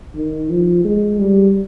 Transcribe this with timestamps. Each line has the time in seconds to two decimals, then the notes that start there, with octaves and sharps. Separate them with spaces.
0.16 D#3
0.50 F3
0.84 G#3
1.19 G3